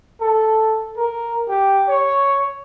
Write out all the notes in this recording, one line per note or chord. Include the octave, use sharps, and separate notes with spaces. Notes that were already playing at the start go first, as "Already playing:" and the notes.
A4
A#4
G4
C#5